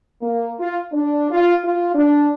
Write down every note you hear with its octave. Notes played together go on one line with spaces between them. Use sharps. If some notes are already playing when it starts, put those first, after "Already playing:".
A#3
F4
D4
F4
F4
D4